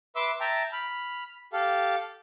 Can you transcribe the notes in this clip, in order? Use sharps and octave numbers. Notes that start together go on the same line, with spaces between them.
B4 E5 C6 D6 E6
E5 G5 A5 A#5
B5 F6
G4 A4 F5